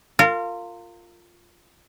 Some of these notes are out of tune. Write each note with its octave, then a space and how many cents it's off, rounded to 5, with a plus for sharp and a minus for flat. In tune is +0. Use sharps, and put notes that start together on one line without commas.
F4 +0 A#4 -30